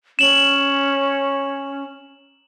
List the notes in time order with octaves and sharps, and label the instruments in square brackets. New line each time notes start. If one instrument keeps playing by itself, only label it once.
[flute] C#4 [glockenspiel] E7 F#7